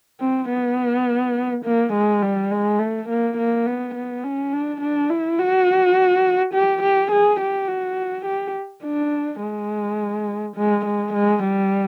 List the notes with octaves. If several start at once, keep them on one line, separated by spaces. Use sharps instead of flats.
C4
B3
A#3
G#3
G3
G#3
A3
A#3
A#3
B3
B3
C#4
D4
D4
E4
F#4
G4
G4
G#4
G4
F#4
G4
D4
G#3
G#3
G#3
G#3
G3